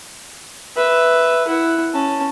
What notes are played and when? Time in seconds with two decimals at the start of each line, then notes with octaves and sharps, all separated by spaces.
0.76 B4 E5
1.48 E4 F#5
1.93 C#4 A5